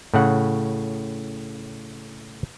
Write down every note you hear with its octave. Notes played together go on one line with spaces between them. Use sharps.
A2 C#3 F#5